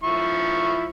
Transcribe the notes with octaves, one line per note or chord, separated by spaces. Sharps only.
F3 E4 C#6